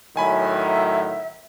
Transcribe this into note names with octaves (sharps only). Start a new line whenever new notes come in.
A2 D#3 F#3 E5 G#5 B5